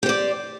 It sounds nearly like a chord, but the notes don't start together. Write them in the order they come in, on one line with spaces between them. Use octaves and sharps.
G4 C5 D5